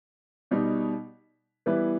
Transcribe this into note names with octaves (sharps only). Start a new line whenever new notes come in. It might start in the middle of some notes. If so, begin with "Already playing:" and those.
B2 G3 D#4
E3 G3 B3 E4 B4